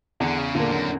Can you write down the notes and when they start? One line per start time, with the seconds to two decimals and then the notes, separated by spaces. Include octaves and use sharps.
0.20 E2 D3
0.38 C#3
0.55 A#2 D3 A#3
0.72 F#2